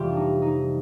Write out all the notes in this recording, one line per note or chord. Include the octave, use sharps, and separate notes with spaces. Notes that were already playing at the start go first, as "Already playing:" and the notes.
Already playing: F2 C3 E3 G3 F4 G4
D4
D#4
D#4